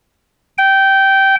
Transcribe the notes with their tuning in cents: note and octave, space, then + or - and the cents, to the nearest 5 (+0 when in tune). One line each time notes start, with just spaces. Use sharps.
G5 -15